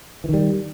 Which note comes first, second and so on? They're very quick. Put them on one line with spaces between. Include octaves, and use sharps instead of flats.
E3 D#3 G3